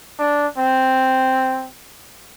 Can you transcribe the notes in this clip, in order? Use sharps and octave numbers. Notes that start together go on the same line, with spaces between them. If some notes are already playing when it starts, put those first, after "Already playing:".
D4
C4